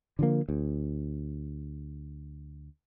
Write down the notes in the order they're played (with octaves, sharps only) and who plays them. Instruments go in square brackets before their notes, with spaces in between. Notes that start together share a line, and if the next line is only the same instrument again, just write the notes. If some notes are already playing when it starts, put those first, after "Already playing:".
[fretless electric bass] D3 F3 A#3
D2